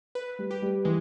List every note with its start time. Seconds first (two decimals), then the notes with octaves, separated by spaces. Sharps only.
0.15 B4
0.39 G3
0.51 G4
0.62 G3
0.85 E3 G#3